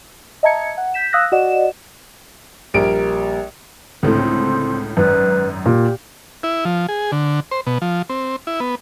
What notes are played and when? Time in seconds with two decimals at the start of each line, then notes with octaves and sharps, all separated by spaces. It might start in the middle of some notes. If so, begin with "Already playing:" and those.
0.43 D#5 E5 A5 A#5 G#6 C#7
0.77 F#5
0.94 G6 B6 E7
1.13 F5 D#6 E6 F#6 A#6
1.32 F#4 D5 D#5 F#5 E7
2.74 A#1 G3 A#4 D7
4.03 C#2 A2 D3 C4
4.97 G#1 F#2 B4
5.66 A#2 G4
6.43 E4
6.65 F3
6.89 G#4
7.12 D3
7.51 C5
7.67 B2
7.82 F3
8.10 C4
8.47 E4
8.60 B3